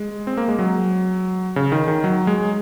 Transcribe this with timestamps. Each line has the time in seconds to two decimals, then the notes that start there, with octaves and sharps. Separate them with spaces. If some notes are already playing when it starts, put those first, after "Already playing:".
Already playing: G#3
0.27 C4
0.37 A#3
0.48 G#3
0.59 F#3
1.56 C#3
1.72 D#3
1.88 D#3
2.04 F#3
2.27 G#3